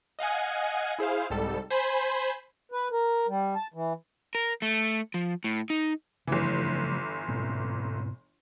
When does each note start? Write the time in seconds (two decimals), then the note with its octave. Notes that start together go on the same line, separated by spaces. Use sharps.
0.19 D#5 F5 F#5 G#5
0.99 E4 G#4 C5 F5
1.30 C2 G#2 G3 A4
1.70 C5 G#5 B5
2.72 B4
2.91 A#4
3.28 G3
3.56 A5
3.74 E3
4.35 A#4
4.62 A3
5.14 F3
5.44 A2
5.70 D#4
6.27 G1 C#3 E3 F3 A3
7.28 G#2 B2 C4